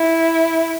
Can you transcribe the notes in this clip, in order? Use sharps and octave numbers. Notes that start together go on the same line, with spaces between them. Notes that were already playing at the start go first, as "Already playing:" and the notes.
Already playing: E4